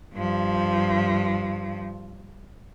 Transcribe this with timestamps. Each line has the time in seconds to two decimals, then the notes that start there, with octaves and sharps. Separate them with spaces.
0.14 G2 F3